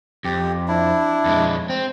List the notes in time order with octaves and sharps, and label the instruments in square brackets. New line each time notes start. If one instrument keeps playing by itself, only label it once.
[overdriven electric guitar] F2 [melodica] G4
[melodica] D4 E4
[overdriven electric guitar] F2 G#3
C4